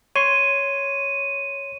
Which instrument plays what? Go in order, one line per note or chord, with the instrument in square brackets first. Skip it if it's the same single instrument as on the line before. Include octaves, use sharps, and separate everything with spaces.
[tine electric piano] C#5 C6 C#6 [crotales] D#7